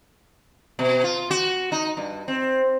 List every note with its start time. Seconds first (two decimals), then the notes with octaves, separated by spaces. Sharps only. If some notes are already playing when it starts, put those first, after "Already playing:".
0.79 B2
1.04 F4
1.31 F#4
1.72 D#4
1.97 G2
2.28 C4